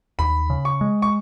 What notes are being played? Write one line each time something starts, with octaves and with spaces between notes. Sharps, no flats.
D#2 B5
C#3
C#6
G#3
C#6